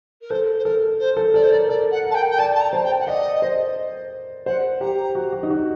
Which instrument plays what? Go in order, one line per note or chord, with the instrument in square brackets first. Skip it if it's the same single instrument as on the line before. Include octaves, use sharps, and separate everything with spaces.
[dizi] A#4
[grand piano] A4 [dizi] C5
[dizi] C5
[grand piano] A4 [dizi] A#4
[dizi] C5
[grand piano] A4
[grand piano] A4 [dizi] D5
[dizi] C5
[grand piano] A#4 [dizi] D5
[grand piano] A4 [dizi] D5
[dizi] F#5
[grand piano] A#4
[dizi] A5
G5
G5
[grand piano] D5 [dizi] A5
[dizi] A5
A#5
[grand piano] C5
[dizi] G5
F#5
[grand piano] D5 [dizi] D#5
[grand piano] C5
[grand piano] C5 [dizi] F#5
[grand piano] G4 [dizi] A#5
[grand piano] F#4
F#4
D#4
F#4